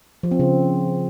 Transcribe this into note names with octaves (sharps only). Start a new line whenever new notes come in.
F3
C4
C#3